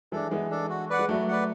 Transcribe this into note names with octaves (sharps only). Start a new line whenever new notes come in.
E3 G#3 D4 A4
E3 G#3 B3
D4 A4
F#4
B4 D5 F#5
G#3
F#3 A3 F#4
B4 D5 F#5